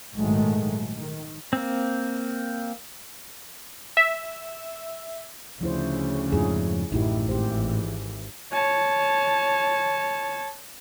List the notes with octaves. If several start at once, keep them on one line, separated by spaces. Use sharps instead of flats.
A#1 G#2 D#3 F#3 G#3 A3
D#3
A#3 C4
E5
D2 C#3 F3 C#4 E4 C5
F2 G#2 F3 E4 G#4
A1 F#2 A2 D#4 E4 G4
G#1 E3 G4 C5
C#5 A5